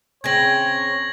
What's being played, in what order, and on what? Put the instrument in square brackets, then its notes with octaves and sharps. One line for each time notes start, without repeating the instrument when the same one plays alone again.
[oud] C#3 C4 [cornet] C#5 [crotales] G#6 A#6 F#7